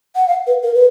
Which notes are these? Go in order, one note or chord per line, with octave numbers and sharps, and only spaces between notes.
F#5
F5
B4
A#4
B4